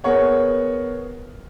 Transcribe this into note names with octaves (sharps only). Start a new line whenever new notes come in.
B3 G#4 A#4 C#5 F#5